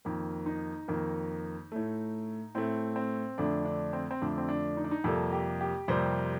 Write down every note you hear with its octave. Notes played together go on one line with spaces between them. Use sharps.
F2 D#3 A#3
D#4
F2 D#3 A#3
A2 A3
A2 A3 C4
C4
F2 D3 A3 D4
D4
C4
C4
F2 D3 A3 D4
C4
D4
D#4
D4
D#4
F2 C3 G3 A#3 A4
G4
G4
F2 C3 G3 A#3 C5